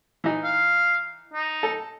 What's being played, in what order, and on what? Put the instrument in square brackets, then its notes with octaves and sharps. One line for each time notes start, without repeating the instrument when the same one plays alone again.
[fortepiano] E3 D#4
[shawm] F5
D#4
[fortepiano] A4